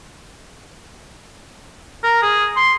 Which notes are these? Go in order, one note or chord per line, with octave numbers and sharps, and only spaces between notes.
A#4
G#4
C6